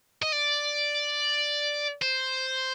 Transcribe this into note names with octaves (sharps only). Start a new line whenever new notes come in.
D#5
D5
C5